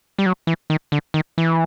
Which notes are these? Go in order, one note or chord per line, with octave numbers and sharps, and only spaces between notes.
G3
F#3
E3
D#3
D3
D#3
E3